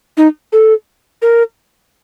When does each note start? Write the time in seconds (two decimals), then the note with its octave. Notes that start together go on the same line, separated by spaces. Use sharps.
0.17 D#4
0.52 A4
1.22 A#4